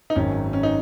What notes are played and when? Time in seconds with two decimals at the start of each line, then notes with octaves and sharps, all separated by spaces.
0.10 D#4
0.15 G#1 F#2 D#3 C#4
0.53 C#4
0.63 D#4